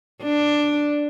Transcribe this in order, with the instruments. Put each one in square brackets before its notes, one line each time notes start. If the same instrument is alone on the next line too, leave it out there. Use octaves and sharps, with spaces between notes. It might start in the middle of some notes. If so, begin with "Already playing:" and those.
[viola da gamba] D4